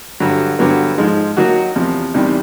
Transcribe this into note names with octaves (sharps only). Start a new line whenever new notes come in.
G2 D3 F#3
G2 D3 F#3 B3
G#2 F3 G#3
D#3 F#3 A#3 D#4 F#4
E2 C3 F3
E2 C3 D#3 G3